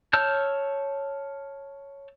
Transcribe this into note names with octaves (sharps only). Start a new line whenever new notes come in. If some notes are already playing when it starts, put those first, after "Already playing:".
C#5 A5 E6 F6 G6